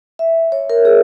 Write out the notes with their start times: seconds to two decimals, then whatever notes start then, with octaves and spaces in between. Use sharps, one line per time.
0.19 E5
0.52 C#5
0.70 A#4
0.85 G#4